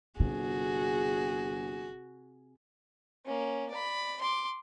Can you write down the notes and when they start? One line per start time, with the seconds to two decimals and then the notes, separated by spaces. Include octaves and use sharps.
0.20 G1 C3 F#4 G#4
3.26 A#3 C#4
3.71 D5 B5
4.21 C6 D6